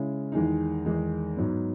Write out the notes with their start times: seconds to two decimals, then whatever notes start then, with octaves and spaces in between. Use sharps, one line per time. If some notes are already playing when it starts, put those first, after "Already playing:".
Already playing: C#3 G#3 C#4 E4
0.32 E2 D#3 G#3 D#4
0.85 E2 D#3 G#3 D#4
1.37 G#2 F#3 B3